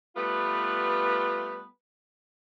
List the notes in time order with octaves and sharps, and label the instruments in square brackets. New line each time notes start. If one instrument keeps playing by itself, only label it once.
[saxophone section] G3 A3 B3 F4 B4